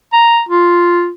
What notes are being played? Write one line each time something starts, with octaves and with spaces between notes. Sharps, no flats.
A#5
F4